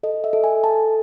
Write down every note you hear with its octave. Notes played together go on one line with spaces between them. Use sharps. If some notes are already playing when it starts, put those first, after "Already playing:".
A4 D#5
E5
A4
G#5
A4 A5